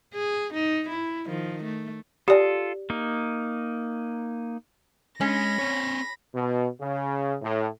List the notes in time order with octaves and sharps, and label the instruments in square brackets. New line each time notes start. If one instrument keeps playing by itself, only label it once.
[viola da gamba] G#4
D#4
E4
D#3 F3
A3
[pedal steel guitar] F4 A4 [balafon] G4 D5
[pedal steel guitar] A#3 D#4
[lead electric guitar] G#3 [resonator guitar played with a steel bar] C#4 [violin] B5 A#6
[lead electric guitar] C4 C#5
[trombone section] B2
C#3
A2